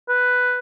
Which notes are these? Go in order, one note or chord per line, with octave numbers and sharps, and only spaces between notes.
B4